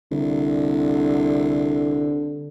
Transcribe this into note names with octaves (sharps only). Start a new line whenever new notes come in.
C2 D3